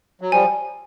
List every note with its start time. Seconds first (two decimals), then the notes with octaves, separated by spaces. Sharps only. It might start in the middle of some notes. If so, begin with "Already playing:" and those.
0.21 F#3
0.32 F3 G3 G#5